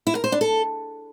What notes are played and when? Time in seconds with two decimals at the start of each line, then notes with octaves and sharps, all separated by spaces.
0.07 E4
0.15 A#4
0.24 C5
0.32 D4
0.41 A4